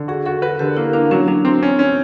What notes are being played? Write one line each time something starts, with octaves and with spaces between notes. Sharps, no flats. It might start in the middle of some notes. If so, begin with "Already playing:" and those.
Already playing: D3
F#4 G#4
F#4 A4
A#4 B4
D3 G4
A#3 E4
A#3 D4
F#3 C#4
F#3 D4
C4 D4
C#4
C#4